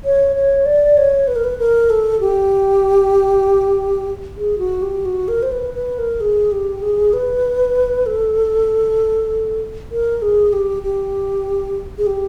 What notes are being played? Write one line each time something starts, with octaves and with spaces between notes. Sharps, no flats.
C#5
C#5
D5
C#5
B4
A#4
B4
A#4
A4
G4
G#4
F#4
G4
F#4
A#4
C5
B4
B4
A#4
G#4
G4
G#4
B4
A4
A#4
G#4
G4
G4
G#4
G4